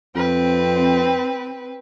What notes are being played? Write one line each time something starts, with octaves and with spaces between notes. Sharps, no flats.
F2 C4 B4